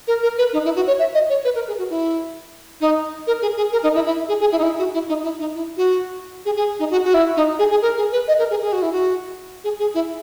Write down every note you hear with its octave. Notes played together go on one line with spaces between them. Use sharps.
A#4
A#4
B4
D#4
E4
F#4
C#5
E5
D#5
C#5
B4
A#4
G#4
F#4
E4
D#4
A#4
G#4
G#4
A#4
D#4
E4
E4
G#4
G#4
E4
D#4
E4
F#4
E4
D#4
E4
D#4
E4
F#4
G#4
G#4
D#4
F#4
F#4
E4
D#4
G#4
G#4
A#4
G#4
B4
D#5
A#4
G#4
G#4
F#4
E4
F#4
G#4
G#4
E4